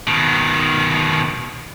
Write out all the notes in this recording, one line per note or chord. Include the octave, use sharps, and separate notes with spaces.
B2 D#3